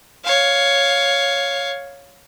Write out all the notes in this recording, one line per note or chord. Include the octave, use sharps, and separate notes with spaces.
C#5 F5